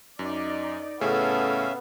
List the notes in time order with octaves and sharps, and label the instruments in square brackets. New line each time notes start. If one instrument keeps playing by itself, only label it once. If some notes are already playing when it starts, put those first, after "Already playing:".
[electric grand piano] F#2 [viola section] D#4 D5
[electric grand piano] A2 C#3 G#4 [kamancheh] B3 [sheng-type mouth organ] C#4 E5 F5 [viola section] A4